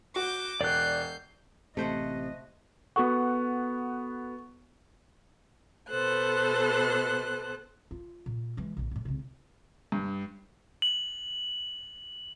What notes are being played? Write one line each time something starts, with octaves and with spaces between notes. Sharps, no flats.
F#4 D6 G6
E1 D5 F#6 G6 C7
A1 C3 A3 C5 D#5 F#5
B3 F#4 A4 F#5 C#6
B2 B3 A4 C5 F#6
F4
A#2
E3 G#3
A#1 A#2
D2 A2
C#2 C3
G2
F#7